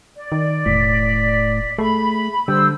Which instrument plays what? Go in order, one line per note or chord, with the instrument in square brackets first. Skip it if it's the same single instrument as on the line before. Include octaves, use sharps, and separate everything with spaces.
[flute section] D5
[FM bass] D#3
[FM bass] E1 [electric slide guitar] A2 [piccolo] B6
[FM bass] A3 [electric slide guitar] G#4 E5 [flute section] B5
[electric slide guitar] D3 [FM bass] G3 [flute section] C5 E6 [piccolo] G6